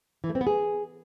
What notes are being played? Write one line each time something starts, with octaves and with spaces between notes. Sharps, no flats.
E3
A3
C4
B3
G#4